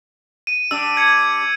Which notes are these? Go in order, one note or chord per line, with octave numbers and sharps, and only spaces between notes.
D#7
G3 D4 E6
G#6 C#7